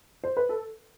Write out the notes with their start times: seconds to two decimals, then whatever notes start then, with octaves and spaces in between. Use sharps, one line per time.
0.24 C5
0.37 B4
0.49 A4